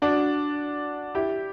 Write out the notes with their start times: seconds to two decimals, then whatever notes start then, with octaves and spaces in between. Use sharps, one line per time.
0.02 D4 F#4
1.15 E4 G4